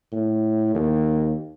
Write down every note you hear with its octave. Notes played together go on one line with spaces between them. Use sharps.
A2
D#2